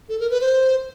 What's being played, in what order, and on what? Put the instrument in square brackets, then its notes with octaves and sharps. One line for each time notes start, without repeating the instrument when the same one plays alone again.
[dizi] A4
A#4
B4
C5